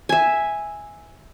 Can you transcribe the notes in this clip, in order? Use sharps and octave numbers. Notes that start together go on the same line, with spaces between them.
E5 G#5